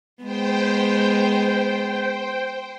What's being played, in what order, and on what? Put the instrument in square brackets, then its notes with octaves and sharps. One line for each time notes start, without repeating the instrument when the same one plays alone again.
[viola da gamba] G#3 B3 [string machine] C5 G5